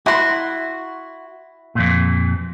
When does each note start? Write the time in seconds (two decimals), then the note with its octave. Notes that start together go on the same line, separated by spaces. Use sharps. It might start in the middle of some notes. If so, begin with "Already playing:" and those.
0.06 E4 F#4 C6
1.75 F2 A#2